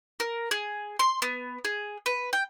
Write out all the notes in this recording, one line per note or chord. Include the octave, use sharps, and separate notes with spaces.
A#4
G#4
C6
B3
G#4
B4
G5